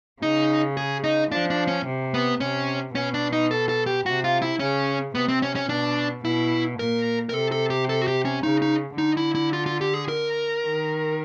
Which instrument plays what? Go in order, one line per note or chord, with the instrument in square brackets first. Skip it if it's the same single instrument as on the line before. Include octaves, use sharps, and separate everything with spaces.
[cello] C#3 [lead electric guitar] D#4
[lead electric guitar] G#4
D#4
[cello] F3 [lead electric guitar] D4
[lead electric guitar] D4
C#4
[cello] C3
[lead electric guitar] B3
[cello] C3 [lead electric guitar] C#4
[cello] B2 [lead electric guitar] C#4
[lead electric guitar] D4
D#4
A4
A4
G4
[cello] C3 [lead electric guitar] F#4
[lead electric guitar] F4
E4
[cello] C#3 [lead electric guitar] C#4
[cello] C3 [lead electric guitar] B3
[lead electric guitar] C4
C#4
C#4
[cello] B2 [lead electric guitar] D4
[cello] B2 [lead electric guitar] E4
[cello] A#2 [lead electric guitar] A#4
[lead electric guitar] A#4
[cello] C3 [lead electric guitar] A4
[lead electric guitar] A4
G4
A4
F#4
G4
C#4
[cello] C#3 [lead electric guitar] D#4
[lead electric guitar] D#4
[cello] D3 [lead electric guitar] D#4
[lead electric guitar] E4
E4
F4
F4
G4
G#4
A#4
[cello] D#3